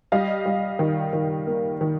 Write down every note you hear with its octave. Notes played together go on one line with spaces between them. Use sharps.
G3 D#5 F5
G3
D#3
D#3
A#3
D#3